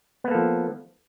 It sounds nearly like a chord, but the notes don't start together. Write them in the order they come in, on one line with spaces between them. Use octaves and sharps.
B3 A#3 A4 F3